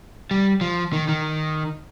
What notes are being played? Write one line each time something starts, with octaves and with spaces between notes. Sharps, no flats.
G3
F3
D#3
D#3